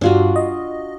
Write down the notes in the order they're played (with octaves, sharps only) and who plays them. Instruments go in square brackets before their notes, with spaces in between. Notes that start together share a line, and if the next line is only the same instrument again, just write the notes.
[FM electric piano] G2 G3 [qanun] D4 F4 F#4
[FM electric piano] D#5